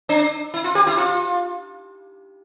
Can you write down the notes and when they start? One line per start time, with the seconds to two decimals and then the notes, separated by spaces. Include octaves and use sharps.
0.09 D4
0.54 E4
0.64 F4
0.75 G4
0.87 E4
0.97 F4